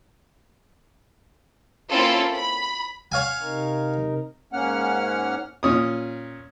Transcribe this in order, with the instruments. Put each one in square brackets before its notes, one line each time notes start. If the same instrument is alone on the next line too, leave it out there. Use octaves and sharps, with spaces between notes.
[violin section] A#3 C4 C#4 E4 F4 A4
B5
[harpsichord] C#5 F5 G#5 [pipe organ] F#5
[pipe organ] C3 D#4 A#4
[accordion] G#2 A#3 C#4 F#5 F6
[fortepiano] A#2 C#4 D#6